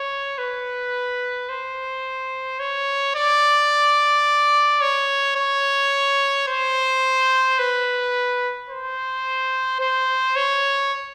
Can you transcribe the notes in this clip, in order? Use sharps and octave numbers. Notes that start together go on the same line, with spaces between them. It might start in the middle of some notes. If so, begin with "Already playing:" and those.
Already playing: C#5
B4
C5
C#5
D5
C#5
C#5
C5
B4
C5
C5
C#5